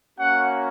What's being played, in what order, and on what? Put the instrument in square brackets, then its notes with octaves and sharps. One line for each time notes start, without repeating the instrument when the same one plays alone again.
[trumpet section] A#3 C#4 F#4 F#5